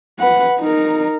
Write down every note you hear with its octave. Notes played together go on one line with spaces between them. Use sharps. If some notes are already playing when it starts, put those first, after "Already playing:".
B4 F#5
D#4 A#4